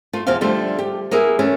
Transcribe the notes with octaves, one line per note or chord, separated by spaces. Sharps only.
A3 F4
E2 B2 F3 C5 F5
D3 F3 G3 A3
G4
A#3 B3 E4 G#4
E3 A3 C#4